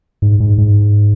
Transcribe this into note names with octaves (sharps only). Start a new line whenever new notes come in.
G#2
G#2
G#2